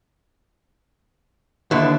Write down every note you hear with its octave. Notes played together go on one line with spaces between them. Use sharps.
D#2 D3 F3 B3 E4